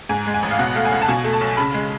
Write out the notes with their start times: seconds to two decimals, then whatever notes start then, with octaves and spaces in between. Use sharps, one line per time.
0.09 G#2 G#5
0.27 G#3
0.34 G#5
0.43 A1
0.51 F5
0.59 B2 F#5
0.75 A3 F5
0.85 G#5
0.92 C#2 F#5
1.02 A5
1.08 B2 G#5
1.24 A3
1.33 A5
1.41 B1
1.57 C#3 B5
1.74 G#3